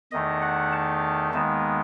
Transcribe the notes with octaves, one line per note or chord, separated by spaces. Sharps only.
E2 D#3 A3 D#4 D#5
F#5
A5
D#2 D#3 G#3 B3 D#4